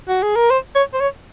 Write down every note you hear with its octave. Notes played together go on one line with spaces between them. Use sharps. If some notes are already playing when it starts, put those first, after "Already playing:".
F#4
G#4
A#4
C5
C#5
C5
C#5